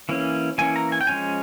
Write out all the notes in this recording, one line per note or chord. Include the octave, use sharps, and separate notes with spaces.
E3 A#3 C#4
E3 A#3 C#4 G#5
A#5
G#5
G5
F3 G#3 C#4 G#5